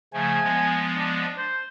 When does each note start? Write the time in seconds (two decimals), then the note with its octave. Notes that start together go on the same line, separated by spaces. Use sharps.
0.14 C#3 F3 A3 G#5
0.44 F3 G#3 B3
0.97 D4
1.38 C5